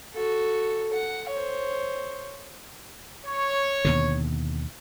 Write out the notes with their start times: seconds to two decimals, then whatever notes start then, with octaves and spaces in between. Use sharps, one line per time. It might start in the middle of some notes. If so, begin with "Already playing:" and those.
0.14 F#4 A4
0.93 F#5
1.29 C5 C#5
3.25 C#5
3.85 D#2 B2 D3